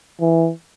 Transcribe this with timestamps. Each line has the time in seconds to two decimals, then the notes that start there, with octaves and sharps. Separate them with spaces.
0.21 E3